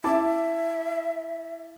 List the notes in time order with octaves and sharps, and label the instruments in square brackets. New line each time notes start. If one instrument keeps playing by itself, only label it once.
[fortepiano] E4 A5 D6 [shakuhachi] E5